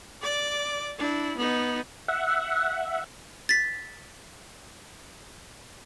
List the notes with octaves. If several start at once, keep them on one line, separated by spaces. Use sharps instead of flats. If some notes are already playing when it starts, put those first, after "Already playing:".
D5 D6
D4 E4
B3 D#4
E5 F#5
A6 B6